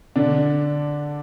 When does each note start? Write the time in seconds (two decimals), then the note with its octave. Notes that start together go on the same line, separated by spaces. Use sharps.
0.16 D3 D4